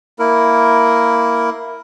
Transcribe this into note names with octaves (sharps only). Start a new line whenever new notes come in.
A#3 E4 A#4